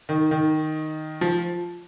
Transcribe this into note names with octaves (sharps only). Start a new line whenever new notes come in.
D#3
D#3
F3